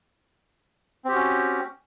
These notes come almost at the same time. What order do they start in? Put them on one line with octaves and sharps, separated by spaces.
C4 G4 F#4 C#4